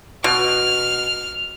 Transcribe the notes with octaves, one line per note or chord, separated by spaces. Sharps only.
B2 F6